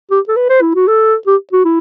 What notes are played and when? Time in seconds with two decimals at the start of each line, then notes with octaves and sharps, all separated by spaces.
0.11 G4
0.28 A4
0.36 B4
0.49 C5
0.62 E4
0.75 F#4
0.88 A4
1.27 G4
1.52 F#4
1.65 E4